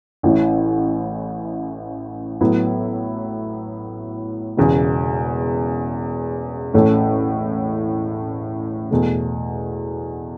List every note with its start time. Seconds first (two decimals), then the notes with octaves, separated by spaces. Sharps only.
0.23 A1 A2 E3 C#4
2.41 A2 F#3 B3 E4
4.57 E1 E2 C#3
6.74 A1 A2 A3 C#4
8.91 E2 B2 A3